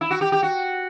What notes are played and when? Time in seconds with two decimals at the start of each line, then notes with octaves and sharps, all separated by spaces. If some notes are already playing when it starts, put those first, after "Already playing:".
0.01 E4
0.11 F#4
0.21 G4
0.32 G4
0.43 F#4